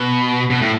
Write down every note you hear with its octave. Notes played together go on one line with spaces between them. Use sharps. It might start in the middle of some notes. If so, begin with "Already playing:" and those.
Already playing: B2
B2
A2